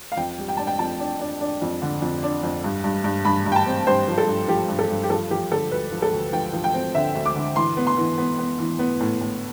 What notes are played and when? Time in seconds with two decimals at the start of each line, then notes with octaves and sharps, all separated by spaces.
0.12 F5
0.17 F2 G5
0.39 G3
0.48 G5
0.57 D4 A5
0.67 G5
0.79 F2 A5
0.99 D4
1.21 D4
1.41 D4
1.62 F2
1.82 D3
2.02 F2
2.23 D4
2.43 F2
2.64 G2
2.84 G2
3.04 G2
3.25 G2 B5
3.46 G2
3.52 G5
3.56 A5
3.66 C4
3.87 G2 C5
4.08 F3
4.18 A4
4.28 G2
4.48 F3 G4
4.68 G2
4.79 A4
4.90 G2
5.03 G4
5.10 F3 A4
5.30 F3 G4
5.51 D3 A4
5.71 D2 B4
5.92 F3
6.02 A4
6.13 D2
6.33 F3 G5
6.53 F3
6.64 G5
6.74 C4
6.95 D3 E5
7.15 D2
7.26 D6
7.36 D3
7.56 E3 C6
7.77 B3
7.87 C6
7.97 E3
8.18 B3
8.39 B3
8.59 E3
8.79 B3
9.00 A2
9.21 A2